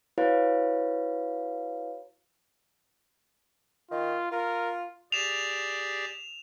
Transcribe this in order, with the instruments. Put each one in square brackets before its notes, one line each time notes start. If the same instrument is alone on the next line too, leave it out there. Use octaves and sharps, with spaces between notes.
[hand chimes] E4 F#4 B4 C#5 F5
[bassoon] D#3 [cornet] F4
[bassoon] F4 [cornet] A#4
[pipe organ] G4 G#4 D5 [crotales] E7 F7